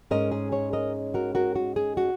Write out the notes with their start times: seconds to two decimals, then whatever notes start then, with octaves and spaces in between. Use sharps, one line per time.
0.10 G#2 G#3 C#4 A#4 D#5
0.32 G#4
0.52 G#4 C#5
0.73 A#4 D#5
1.14 F#4 A#4
1.35 F#4 A#4
1.55 F#4
1.76 G#4
1.97 F#4